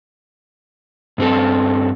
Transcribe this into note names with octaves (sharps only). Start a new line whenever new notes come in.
G2 C4 A4